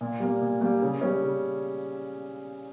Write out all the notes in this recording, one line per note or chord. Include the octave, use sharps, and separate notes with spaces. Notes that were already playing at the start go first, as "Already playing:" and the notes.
A#2
G3 A#3
A#2
G3 A#3
C#3
G3 C#4
C#3